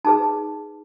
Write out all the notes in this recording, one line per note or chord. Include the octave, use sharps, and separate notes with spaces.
D#4 G#4 B4 A5